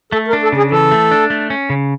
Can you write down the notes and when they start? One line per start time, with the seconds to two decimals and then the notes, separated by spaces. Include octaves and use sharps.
0.12 A3 A4
0.28 A#4
0.33 D4
0.43 A4
0.52 C#3
0.57 G#4
0.71 E3 A4
0.91 A3
1.11 D4
1.30 A3
1.50 C#4
1.70 C#3